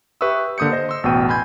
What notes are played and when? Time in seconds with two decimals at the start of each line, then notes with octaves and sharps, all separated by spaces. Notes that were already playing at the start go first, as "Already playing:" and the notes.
0.21 G4 B4 E5 C#6 D#6 E6
0.58 D3 A#3 D#6 G6 C#7
0.72 C5 D#5 A#6
0.89 C6 E6
1.04 A1 E2 B2 G5 D#7
1.28 G#5 B5 C6 G6 G#6